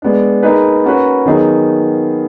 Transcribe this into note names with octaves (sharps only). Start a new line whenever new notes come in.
G#3 B3 D4
A#3 D#4 G#4 B4
A#3 C#4 F#4 B4
D#3 F#3 B3 D#4 G#4